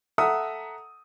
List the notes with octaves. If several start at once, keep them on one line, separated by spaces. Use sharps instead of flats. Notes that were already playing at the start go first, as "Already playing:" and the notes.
A4 E5 F#5 A#5 D#6